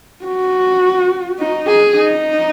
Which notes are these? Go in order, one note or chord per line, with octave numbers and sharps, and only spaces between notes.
F#4
D#4
G#4
D#4